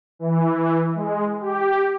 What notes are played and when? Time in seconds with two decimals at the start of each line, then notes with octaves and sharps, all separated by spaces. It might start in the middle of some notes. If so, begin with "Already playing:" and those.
0.19 E3
0.95 G#3
1.41 G4